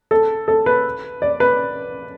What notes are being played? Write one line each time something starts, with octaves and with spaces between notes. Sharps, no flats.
A4
A4
B4
D5
B4